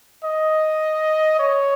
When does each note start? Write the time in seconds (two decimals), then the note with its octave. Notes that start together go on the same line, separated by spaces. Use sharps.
0.24 D#5
1.39 C#5